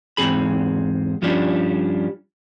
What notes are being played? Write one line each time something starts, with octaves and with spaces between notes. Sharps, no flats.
E2 G#2 C3 C4 G#4 B5
G2 F3 G3 C#4 D4